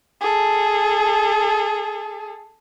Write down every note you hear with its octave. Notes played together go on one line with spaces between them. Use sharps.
G#4 A4